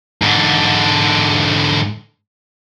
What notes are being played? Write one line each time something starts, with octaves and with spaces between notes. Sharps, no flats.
G#2 D3